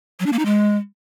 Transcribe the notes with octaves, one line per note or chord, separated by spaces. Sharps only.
F#3
D4
A#3
D#4
G#3